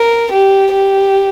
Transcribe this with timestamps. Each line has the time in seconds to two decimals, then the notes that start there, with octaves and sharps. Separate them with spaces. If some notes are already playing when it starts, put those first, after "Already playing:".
Already playing: A#4
0.32 G4
0.73 G4